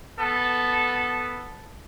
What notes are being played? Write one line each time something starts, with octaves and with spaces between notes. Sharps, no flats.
B3 A4